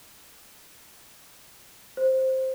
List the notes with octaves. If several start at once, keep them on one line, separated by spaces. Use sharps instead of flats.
C5